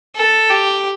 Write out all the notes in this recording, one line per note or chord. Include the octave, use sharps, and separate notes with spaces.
A4
G4